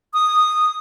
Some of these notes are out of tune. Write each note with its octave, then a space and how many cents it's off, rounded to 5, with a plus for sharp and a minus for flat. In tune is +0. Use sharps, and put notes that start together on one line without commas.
D#6 -10